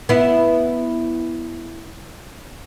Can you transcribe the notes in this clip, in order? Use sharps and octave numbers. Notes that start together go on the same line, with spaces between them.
B3 E4